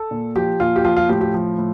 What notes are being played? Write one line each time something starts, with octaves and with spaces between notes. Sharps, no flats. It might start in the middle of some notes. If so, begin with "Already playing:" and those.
Already playing: A4
A#2
F3 G4
A#2 F4
G4
F3 F4
F4
A2 G4
G4
F3
A2